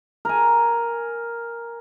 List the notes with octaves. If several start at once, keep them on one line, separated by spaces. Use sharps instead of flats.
A#4 G#5